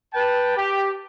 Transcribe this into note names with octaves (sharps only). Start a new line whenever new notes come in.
B4 G5 A5
G4